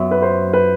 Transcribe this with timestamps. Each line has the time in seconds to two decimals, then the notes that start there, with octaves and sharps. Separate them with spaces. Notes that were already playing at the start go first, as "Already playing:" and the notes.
Already playing: F#2 F#3 B3 E5
0.11 B4
0.22 C5
0.53 B4